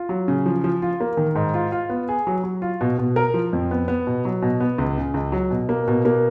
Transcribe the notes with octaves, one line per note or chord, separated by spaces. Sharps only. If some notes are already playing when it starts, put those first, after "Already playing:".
Already playing: F4
F#3
C#3
F3
F3
F4
A#3
D#3
G#2
F4
F4
B3
G#4
F#3
F#3
F4
B2
B2
A#4
F3
F2
B3
B3
B2
F#3
B2
B3
C#2
C#3
C#2
F#3
B2
A#3
B2
A#3